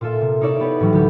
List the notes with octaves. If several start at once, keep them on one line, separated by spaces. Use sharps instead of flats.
A#2 F4 A4 E5
C3
D#4 E4 C#5 D5 E5
B3 G4 B4
A2 E3 F#3 G3
D2 G4